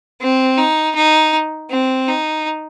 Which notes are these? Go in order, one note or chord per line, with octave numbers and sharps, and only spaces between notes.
C4
D#4
D#4
C4
D#4